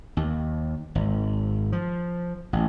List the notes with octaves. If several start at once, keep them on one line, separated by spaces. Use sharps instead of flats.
D#2
G#1
F3
A1